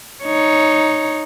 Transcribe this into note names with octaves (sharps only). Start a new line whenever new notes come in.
D#4 C#5